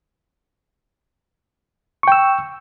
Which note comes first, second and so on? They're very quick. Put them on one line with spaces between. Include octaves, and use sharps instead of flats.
C#6 G5 E6